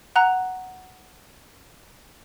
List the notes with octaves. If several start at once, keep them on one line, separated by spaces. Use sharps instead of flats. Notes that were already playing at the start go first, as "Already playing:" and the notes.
F#5 A#5 F#6